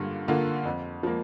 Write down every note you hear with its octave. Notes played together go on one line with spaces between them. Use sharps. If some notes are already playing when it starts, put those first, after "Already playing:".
Already playing: G2 D3 A#3 F4
D3 A#3 F4
F2
F3 A#3